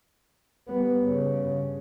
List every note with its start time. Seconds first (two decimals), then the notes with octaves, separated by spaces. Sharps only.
0.68 G3 B3
1.03 G2 C#3